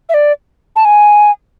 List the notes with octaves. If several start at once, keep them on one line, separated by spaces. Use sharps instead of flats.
E5
D5
A5
G#5